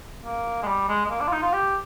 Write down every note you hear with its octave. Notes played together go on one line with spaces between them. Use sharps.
A#3
G#3
G3
G#3
G#3
A#3
D4
F4
D#4
F4
G4